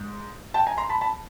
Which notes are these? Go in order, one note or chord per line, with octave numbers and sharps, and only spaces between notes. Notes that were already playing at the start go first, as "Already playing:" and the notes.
Already playing: G#2
G5 A5
G#5 A#5
A#5 C6
A5 B5
A5 B5